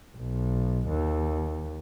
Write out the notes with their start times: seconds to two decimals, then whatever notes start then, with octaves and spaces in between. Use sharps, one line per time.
0.17 B1
0.88 D#2